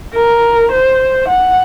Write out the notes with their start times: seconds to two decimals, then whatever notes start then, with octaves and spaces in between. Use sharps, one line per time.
0.14 A#4
0.71 C5
1.28 F#5